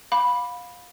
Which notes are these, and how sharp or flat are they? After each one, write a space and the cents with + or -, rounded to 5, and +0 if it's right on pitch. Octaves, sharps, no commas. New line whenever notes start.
F5 +25 B5 -5 D6 +0